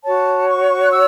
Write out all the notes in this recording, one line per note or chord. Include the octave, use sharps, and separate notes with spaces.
F#4 C#5 A5
C#6
F#6
E6